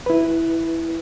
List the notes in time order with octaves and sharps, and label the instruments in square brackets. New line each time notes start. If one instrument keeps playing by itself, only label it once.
[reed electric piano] E4 B4